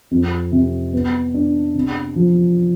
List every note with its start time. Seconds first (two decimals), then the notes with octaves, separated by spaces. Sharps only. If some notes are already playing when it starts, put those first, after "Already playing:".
0.11 F2
0.52 C3
0.93 B3
1.34 D4
1.75 C3
2.16 F3